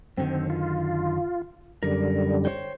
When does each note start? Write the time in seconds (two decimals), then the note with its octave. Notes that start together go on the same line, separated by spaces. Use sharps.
0.17 F#2 D3 D#3 C4
0.50 F4
1.83 F#2 D3 G3 A#4
2.45 C5 C#5 G5